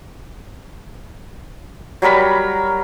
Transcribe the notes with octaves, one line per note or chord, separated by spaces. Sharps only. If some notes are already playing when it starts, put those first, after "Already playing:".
F#3 G3 A#4 B5